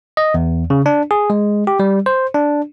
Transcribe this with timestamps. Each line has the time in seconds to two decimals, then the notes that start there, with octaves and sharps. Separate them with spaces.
0.17 D#5
0.34 E2
0.70 C#3
0.86 D4
1.11 G#4
1.30 G#3
1.67 G4
1.80 G3
2.06 C5
2.34 D4